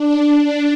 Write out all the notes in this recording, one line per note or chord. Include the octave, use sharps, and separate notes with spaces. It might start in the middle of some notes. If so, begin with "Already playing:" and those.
Already playing: D4
D4